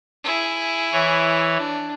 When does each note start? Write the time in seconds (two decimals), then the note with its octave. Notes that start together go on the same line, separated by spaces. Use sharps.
0.24 E4 G#4
0.92 E3 C#5
1.57 D4